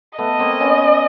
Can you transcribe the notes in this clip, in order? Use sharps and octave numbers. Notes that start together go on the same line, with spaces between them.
A3 B3 D#5
A#3 C4
B3 C#4